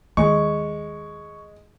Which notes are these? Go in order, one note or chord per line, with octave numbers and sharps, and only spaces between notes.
D#2 G#3 C#6